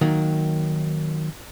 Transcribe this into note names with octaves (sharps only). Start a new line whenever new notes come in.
D#3 F#3 A#3